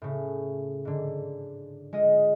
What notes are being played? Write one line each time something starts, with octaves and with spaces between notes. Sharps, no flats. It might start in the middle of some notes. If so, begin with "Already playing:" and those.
A2 C#3
G#2 D3
G#3 F4 D#5